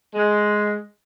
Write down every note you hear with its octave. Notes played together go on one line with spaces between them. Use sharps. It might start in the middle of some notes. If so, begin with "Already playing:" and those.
G#3